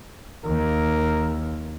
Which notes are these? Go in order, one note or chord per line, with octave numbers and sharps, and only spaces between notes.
D#2 A#4